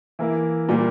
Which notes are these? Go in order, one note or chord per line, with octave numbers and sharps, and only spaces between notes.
E3 A#3 E4
A#2 G3 A#3